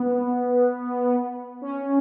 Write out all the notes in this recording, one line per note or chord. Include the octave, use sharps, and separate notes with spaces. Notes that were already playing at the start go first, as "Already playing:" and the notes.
Already playing: B3
C#4